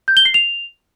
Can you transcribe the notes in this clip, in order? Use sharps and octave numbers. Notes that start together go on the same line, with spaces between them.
G6
G7
C7
F7